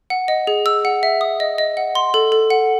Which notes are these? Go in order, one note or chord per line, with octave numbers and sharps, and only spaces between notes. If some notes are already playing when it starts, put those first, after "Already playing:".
F#5
D#5
G#4
E6
F#5
E5
D#6
D#5
D#5
F#5
C6
A4
A4
F#5